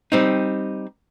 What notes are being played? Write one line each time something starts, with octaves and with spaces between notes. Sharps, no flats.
G3 C4 D#4